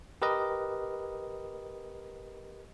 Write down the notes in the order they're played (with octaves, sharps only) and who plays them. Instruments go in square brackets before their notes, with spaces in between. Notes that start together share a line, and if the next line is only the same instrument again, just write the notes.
[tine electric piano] G4 A#4 B4 D#5